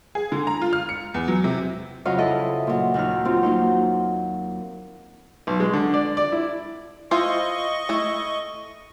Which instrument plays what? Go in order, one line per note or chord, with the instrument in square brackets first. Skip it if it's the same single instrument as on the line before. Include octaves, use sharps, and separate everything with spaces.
[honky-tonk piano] G#4
D3
A#5
F4
F6
C#7
E2
F#3
C3
[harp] F2 C#3 F#3 C#5 D#5 F5
E4 A4 D#5 E5
A#2 F#3
D#2 D#3 F#4 F6
F#3 C4 F4
F#3 A#3 D#4
[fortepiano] B1
G#3
D3
D5
D5
E4
[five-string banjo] E4 F4 C5 [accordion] D#5 C#6
[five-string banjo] A3 E4